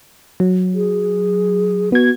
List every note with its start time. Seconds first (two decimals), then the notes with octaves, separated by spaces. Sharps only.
0.40 F#3
0.74 G#4
1.92 B3 F#4 G#6